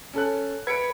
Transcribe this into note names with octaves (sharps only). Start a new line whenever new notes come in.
C#4 A4 F#6
B4 G#6 C#7 D7